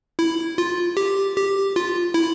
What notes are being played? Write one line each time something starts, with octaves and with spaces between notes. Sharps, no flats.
E4
F4
G4
G4
F4
E4